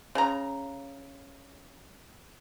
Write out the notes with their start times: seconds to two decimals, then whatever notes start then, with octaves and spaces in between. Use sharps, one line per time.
0.15 C#3 A#5